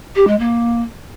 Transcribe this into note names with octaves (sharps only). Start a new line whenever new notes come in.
G4
G#3
A#3